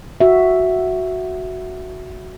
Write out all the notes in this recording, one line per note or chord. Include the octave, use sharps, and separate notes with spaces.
F#4 E5